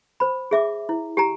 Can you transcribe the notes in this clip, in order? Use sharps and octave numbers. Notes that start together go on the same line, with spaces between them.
C5 B5
G#4 E5 D6
E4
G4 G#5 A#5